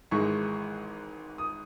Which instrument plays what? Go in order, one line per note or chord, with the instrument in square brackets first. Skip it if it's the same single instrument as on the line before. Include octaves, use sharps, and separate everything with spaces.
[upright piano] G#1 G#2 E3 G#3 C#6
D#6